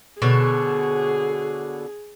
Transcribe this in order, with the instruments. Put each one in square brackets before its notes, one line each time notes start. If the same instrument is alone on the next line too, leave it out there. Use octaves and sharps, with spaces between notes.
[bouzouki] B2 D3 C#5 [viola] G#4